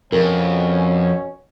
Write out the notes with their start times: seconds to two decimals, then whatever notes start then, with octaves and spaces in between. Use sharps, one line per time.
0.12 F2 B2 C#4 A#4